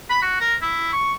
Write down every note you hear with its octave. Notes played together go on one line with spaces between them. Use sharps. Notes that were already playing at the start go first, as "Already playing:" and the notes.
B5
F#4
A#4
E4
C#6